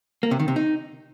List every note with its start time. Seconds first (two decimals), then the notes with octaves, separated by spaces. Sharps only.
0.23 A#3
0.31 C3
0.40 D#3
0.48 C3
0.56 D#4